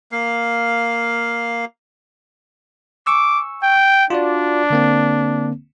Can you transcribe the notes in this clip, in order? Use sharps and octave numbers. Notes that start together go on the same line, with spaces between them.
A#3 F5
G#5 C#6 D6 E6
G5
D4 F4 F#4 D5
D3 A#3 C4